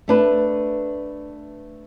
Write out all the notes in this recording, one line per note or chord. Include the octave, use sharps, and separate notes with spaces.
A3 D4 B4